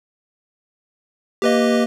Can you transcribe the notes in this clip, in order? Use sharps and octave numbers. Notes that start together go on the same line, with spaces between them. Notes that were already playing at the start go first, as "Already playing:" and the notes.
A#3 G4 B4 D#5